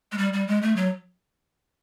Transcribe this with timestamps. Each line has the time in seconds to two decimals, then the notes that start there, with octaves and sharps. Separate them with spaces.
0.12 G#3
0.18 G3
0.33 G3
0.48 G#3
0.62 A3
0.76 F#3